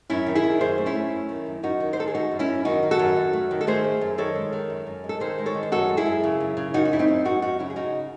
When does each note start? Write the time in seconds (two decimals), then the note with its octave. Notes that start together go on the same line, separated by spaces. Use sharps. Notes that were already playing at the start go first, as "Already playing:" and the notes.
0.10 F#2 C#4 E4
0.26 D#3
0.35 E4 G#4
0.44 D#3
0.61 F#2 G#4 C5
0.78 A3
0.86 C#4 E4
0.95 A3
1.12 F#2
1.29 D#3
1.46 F#2
1.63 F#2 D#4 F#4
1.80 D#3
1.93 C5
1.97 D#3 A4
2.07 G#4
2.14 A3 D#4 F#4
2.31 F#2
2.39 C#4 E4
2.48 F#2
2.65 D#3 D#4 F#4
2.83 D#3
2.91 F#4 A4
2.99 F#2
3.16 F#2
3.33 A3
3.51 D#3
3.61 A4
3.67 A3 G#4 C5
3.84 A3
4.01 F#2
4.18 D#3 A4 C#5
4.35 G#3
4.53 D#3
4.70 F#2
4.86 F#2
5.04 G#3
5.09 A4
5.20 D#3 G#4 C5
5.38 G#3
5.46 A4 C#5
5.55 D#3
5.63 C5
5.72 F#2 F#4 A4
5.89 G#3
5.97 E4 G#4
6.06 F#2
6.23 C#3
6.40 F#2
6.57 C#3
6.74 F#2 D#4 F#4
6.85 F#4
6.91 F#2 E4
6.99 C4 D#4
7.08 F#2
7.25 F#2 D#4 F#4
7.42 F#2 D#4 F#4
7.59 C#3 C#4 E4
7.70 G#4
7.76 C#3 D#4 F#4